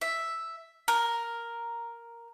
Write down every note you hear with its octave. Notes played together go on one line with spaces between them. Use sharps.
E5
A#4